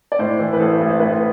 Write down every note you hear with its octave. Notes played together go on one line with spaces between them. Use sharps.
D5
A2 C5
E3
B4
A1 A4
A1
C5
A2 B4